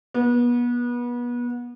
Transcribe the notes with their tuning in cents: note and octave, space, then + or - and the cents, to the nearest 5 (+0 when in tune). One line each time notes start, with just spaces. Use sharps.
B3 -30